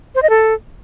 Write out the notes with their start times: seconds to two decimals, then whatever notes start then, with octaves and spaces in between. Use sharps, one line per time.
0.15 C5
0.22 D#5
0.30 A4